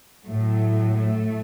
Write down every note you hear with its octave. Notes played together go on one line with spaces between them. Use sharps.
A2 F#3 A3
A3